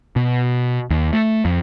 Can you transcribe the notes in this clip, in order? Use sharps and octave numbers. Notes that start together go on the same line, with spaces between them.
B2
D#2
A3
F2